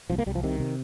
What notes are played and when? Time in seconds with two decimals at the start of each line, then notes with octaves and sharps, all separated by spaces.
0.10 C2 F3
0.18 A#3
0.26 C2 G3
0.35 F3
0.43 C3 D#3
0.60 C3